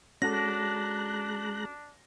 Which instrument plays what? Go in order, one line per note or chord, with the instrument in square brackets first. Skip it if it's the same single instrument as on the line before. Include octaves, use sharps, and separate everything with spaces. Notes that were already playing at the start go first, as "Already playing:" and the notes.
[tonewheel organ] G#3 A#5 F#6 [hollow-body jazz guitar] C#4 F#4 A4 [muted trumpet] D4 [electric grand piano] A#6